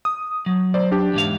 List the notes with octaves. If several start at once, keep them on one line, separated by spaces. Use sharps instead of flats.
D#6
F#3
C5 D5
D4 G4
E2 G#2 F5